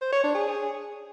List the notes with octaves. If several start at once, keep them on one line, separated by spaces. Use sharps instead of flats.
C5
C#5
D4
G#4